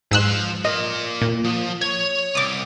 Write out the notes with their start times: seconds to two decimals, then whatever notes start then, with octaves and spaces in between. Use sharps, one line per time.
0.11 G#2 F3 C6 E6 F#6
0.65 F4 A#4 D#5
1.22 A#2
1.44 F3
1.82 C#5 G#6
2.35 C2 D6 D#6